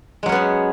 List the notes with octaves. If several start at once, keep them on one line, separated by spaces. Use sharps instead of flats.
F#3 G#3 B3 C#4 G#4